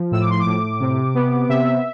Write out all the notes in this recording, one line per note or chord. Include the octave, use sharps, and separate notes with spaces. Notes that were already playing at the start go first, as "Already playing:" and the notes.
Already playing: F3
A2 E6
D6
C6
D6
A2
C3
B3
C3 E5